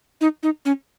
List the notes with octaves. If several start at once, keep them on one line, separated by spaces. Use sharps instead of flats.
D#4
D#4
C#4